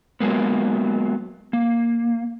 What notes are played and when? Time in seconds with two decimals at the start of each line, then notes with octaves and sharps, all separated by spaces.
0.20 F#3 G#3 A#3 B3
1.53 A#3